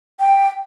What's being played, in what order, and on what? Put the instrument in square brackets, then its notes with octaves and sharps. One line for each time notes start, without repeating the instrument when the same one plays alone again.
[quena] G5